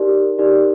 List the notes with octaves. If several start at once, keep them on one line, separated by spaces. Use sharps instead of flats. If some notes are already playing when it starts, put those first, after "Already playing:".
Already playing: D#4 G4 A#4 D5
D#4 G4 A#4 D5